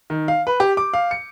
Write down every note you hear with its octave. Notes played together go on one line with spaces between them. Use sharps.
D#3
F5
B4
G4
D6
F5
C#7